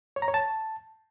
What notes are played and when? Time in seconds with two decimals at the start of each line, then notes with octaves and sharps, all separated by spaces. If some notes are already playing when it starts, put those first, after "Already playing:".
0.16 C#5
0.22 A#5
0.28 C#5
0.34 A5